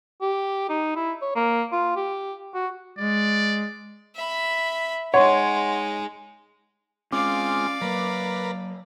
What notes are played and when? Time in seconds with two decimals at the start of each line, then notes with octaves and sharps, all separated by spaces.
0.22 G4
0.69 D#4
0.96 E4
1.22 C#5
1.36 A#3
1.72 F4
1.96 G4
2.55 F#4
2.98 G#3 D5
4.16 E5 B5
5.14 G#3 D#4 C#5 F#5 C6
7.12 G#3 C4 C#4 F4 D5 F5 D6
7.81 F#3 A#3 A#4 B4